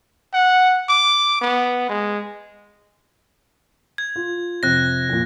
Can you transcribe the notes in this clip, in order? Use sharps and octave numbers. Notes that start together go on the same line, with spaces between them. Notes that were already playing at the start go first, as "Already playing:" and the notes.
F#5
D6
B3
G#3
G#6
F4
F2 C3 C4 F#6 A#6
F2 A#2